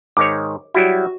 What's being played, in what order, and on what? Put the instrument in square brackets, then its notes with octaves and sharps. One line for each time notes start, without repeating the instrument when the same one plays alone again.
[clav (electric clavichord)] G#2 D#3 C#5 [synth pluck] D6
[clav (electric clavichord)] F#3 G3 E4 [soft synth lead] F#4